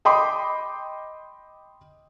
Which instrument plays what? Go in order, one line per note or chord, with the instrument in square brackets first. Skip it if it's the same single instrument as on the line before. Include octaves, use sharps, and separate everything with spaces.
[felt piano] D#5 G5 B5 C6 D6 D#6